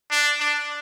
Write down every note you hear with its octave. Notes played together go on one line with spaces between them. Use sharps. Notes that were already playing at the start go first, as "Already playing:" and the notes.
D4
D4